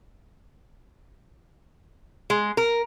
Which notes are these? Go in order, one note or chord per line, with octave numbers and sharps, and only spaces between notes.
G#3
A#4